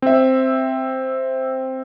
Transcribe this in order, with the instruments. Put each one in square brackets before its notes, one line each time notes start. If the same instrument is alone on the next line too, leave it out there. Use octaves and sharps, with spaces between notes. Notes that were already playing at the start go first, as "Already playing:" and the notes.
[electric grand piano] C4 E5